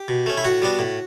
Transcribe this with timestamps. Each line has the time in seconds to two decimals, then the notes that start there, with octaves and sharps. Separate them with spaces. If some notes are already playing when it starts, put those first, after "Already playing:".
Already playing: G4
0.08 B2
0.26 A3 C#4
0.37 E4
0.44 A2 F#4
0.62 G3 B3 D4
0.79 A2